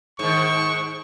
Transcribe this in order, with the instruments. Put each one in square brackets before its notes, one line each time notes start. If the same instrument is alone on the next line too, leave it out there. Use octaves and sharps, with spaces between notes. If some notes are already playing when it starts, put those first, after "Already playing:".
[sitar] G#2 D#3 [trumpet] C#6